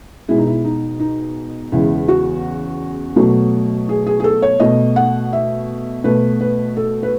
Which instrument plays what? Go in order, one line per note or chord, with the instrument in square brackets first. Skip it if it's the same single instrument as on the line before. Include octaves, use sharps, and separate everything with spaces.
[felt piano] B2 G#3 E4
D#4
E4
D#4
D#4
E2 C#3 G#3 E4
F#4
B2 F#3 A3
G#4
G#4
G#4
A4
C#5
B2 A3 D#5
F#5
E5
B2 A3 B4
B4
A4
B4